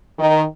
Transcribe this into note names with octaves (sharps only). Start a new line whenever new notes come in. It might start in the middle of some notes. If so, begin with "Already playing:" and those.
D#3